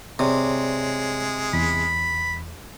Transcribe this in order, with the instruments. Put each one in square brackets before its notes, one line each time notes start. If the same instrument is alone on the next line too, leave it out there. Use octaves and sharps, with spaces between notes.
[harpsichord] C3 [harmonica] G#3 [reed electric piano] G#4 C#5 D5
[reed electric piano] E2 [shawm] B5